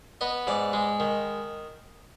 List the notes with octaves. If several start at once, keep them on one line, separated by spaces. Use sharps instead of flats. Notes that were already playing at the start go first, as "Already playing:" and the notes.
B3 D#5
G#2 D5
G#3
D#3